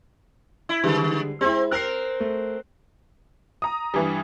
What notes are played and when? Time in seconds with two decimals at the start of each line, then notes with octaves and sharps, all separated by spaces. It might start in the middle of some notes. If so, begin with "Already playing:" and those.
0.69 E4
0.84 D3 D#3 G3 G#3
1.41 G#3 C4 E4
1.71 C4 A#4 F#6 C7
2.20 A3
3.62 A#5 D#6
3.94 G2 E3 G3